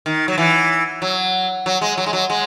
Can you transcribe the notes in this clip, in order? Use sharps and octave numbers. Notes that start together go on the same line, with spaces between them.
D#3
F#3
E3
F#3
F#3
G#3
F#3
G#3
F#3
G#3